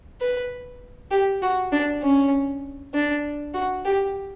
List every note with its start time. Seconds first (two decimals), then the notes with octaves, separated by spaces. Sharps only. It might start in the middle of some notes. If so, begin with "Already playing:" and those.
0.21 B4
1.11 G4
1.42 F#4
1.72 D4
2.02 C#4
2.94 D4
3.54 F#4
3.85 G4